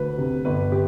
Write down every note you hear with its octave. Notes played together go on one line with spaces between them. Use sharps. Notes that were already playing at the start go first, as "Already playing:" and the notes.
Already playing: D2 B4
C3
G1 B4
G4